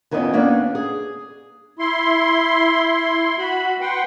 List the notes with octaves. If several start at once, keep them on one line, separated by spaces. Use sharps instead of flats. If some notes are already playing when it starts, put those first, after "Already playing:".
F2 D#3 E3 B3 C#4 D#5
A#3 B3 C#4 D4
G#4
E4 C6
F#4 B5
B4 F#5 G5 C6